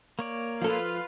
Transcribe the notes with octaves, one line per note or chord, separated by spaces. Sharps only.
A#3 C#5 D5
F3 F4 A4 B4 F5